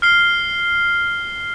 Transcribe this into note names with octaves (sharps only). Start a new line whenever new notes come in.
F6 C7 G7